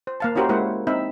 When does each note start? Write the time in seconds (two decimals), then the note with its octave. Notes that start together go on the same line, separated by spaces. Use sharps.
0.07 C5
0.20 A#3 F5 A5
0.36 C#4 E4 F#4 G4 A#4 C5
0.49 G#3 A#3 E4 C5 F#5
0.87 C4 D#4 E5 B5